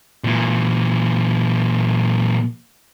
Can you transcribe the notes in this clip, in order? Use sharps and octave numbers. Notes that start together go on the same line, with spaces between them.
A#2 E3